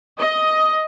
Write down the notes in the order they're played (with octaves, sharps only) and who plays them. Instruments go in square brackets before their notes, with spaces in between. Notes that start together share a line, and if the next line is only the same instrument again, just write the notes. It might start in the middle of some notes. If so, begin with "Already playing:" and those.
[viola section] D#5